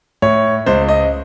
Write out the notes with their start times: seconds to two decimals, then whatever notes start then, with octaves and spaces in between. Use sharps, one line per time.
0.22 A2 C#5
0.66 C#2 C5
0.89 D#5